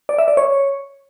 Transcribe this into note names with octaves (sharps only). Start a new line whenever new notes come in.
D5
E5
D5
C#5